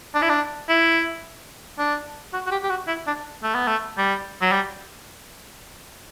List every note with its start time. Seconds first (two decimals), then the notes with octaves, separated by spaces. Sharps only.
0.14 D4
0.22 E4
0.29 D4
0.69 E4
1.79 D4
2.33 F#4
2.47 F#4
2.51 G4
2.64 G4
2.70 F#4
2.88 E4
3.07 D4
3.43 A3
3.55 B3
3.68 A3
3.98 G3
4.42 F#3
4.52 G3